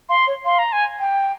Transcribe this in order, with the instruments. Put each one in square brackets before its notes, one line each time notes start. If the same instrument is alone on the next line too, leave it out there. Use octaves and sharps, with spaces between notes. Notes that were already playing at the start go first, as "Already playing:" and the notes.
[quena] F5 [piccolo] C6
[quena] C#5
[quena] F5 [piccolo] C6
[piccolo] A#5
G#5
[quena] G5